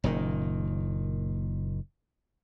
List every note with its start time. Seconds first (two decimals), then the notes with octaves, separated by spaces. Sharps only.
0.04 F#1 A#2 D#3